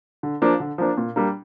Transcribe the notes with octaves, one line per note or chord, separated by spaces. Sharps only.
D3
F3 A#3 D4
D3
F3 A#3 D4
A#2
G3 A#3 D4